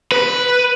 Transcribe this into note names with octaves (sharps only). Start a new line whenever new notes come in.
B4